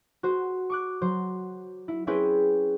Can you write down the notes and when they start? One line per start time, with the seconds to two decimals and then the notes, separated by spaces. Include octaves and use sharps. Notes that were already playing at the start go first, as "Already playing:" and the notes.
0.23 F#4 C5
0.70 C#6 D6 F#6
1.02 F#3 C5
1.88 E4
2.07 C4 C#4 E4 G#4 B4 G5